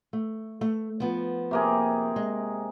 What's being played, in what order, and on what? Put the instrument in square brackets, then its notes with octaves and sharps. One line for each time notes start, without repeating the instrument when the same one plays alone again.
[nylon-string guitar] A3
A3
F3 B3
[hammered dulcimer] C3 A#3 G#4
[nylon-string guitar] G#3